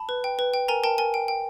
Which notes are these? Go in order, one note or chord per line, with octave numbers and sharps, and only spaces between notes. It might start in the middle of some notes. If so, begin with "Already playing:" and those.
Already playing: A5 B5
B4
G5
B4
G5
A#4 G#5 A#5
A#4 G5 A5
A#4 G#5
G5
G5